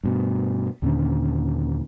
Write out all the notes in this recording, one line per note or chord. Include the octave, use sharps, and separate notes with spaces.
G2 B2
D#2 A#2 D3 C#4